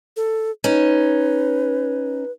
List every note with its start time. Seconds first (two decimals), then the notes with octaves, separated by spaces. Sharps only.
0.16 A4
0.64 C#4 D#4 B4